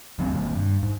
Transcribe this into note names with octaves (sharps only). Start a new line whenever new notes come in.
D2 F3 G3 C4
B2 D#3 A#3
G2
G#2